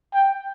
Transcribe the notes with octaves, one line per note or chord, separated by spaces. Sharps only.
G5